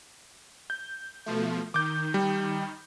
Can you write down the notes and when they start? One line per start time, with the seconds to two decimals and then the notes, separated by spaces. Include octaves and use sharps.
0.70 G6
1.26 B2 F3 A3
1.74 D#3 D6 G6
2.14 G3